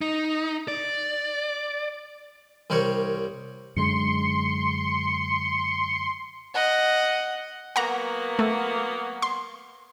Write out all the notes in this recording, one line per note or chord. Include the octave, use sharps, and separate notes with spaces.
D#4
D5
C2 G3 A#4 C5 C#5
F#2 D3 G#3 C6 C#7
D#5 F#5
F#3 A#3 B3 F#5 A#5
A3
C6